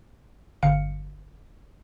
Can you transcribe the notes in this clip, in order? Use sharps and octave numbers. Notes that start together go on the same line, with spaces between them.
G1 F5 C#7